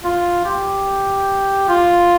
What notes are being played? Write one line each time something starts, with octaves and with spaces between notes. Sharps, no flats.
F4
G4
F4